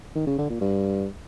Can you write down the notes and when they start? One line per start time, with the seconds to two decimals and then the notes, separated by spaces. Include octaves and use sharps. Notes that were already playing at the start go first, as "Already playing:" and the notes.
0.16 D#3
0.27 C#3
0.38 D3
0.50 A#2
0.61 G2